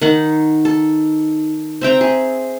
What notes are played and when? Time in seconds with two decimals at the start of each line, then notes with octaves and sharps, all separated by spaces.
0.02 D#3 D#4 F#5
0.65 A4
1.82 C4 E5 G5 A#5
2.01 G#4